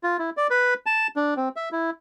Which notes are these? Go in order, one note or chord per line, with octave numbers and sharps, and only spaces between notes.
F4
E4
D5
B4
A5
D4
C4
E5
E4